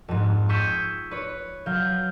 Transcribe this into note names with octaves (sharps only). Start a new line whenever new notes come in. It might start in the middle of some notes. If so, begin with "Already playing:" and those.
F2 G#2
C#6 D#6 E6 G6 G#6 B6
B4 C#5
F#3 F5 G6